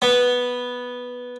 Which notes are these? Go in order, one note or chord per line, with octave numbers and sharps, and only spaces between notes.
B3